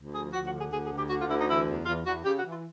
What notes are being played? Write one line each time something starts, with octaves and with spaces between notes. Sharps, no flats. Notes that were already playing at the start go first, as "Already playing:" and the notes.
Already playing: D2
F3 G#4
D2 F#4
F#4
D3
G#4
D2 G#4
G#4
D2
G4
D3 F#4
F4
D2 E4
D#4
E3 E4
E2
E2 F4
E2 F#4
C#3 G4
F#4
E3
F4